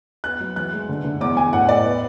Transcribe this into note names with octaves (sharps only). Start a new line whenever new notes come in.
B3 F#6
F#3
E3 F#6
G#3
D3
D3
E2 D6
E2 G#5
A2 F#5
A2 D5
B3